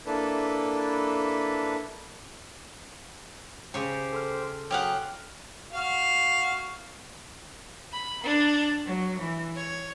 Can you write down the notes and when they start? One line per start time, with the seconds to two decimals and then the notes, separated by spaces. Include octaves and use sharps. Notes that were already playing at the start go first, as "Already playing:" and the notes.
0.06 A#3 D4 E4 A4 B4
3.74 C#3 G4 C5 C#5 G5
4.13 A4 C6 F6
4.71 F#3 G4 G#4 F5 F#5
5.73 F#4 F5
7.91 B5
8.24 D4
8.87 F#3
9.19 E3
9.55 C#5